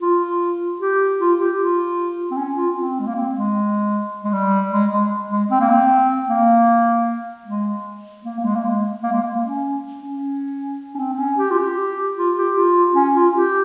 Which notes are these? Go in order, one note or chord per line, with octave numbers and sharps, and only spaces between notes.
F4
G4
F4
G4
F4
C4
C#4
F4
C4
G#3
A#3
C4
G#3
G#3
G3
G#3
G#3
G#3
C4
A#3
C4
A#3
G#3
A#3
A#3
G#3
A#3
G#3
A#3
G#3
A#3
C#4
C#4
C#4
C4
C4
C#4
G4
F4
G4
F4
G4
F4
C#4
F4
G4